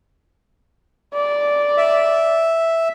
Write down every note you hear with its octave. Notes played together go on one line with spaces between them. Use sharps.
D5
E5